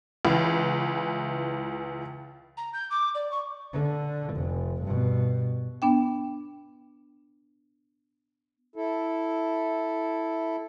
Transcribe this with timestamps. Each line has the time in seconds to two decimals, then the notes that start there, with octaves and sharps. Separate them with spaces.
0.25 C#2 E3
2.57 A#5
2.73 G6
2.90 D6
3.15 D5
3.31 C#6
3.73 D3
4.34 F1
4.82 G2 B2
5.82 B3 D4 G5
8.76 E4 A4